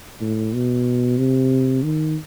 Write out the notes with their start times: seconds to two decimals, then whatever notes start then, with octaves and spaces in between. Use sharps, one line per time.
0.21 A2
0.53 B2
1.18 C3
1.83 D#3